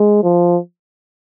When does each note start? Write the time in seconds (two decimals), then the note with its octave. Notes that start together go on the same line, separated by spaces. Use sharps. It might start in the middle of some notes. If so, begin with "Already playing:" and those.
Already playing: G#3
0.23 F3